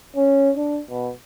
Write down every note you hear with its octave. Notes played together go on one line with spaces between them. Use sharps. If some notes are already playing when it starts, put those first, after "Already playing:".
C#4
D4
B2